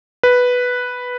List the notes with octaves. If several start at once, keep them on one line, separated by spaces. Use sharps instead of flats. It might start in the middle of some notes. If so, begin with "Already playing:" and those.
B4